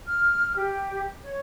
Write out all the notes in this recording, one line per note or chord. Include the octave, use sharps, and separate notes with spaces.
F6
G4
C#5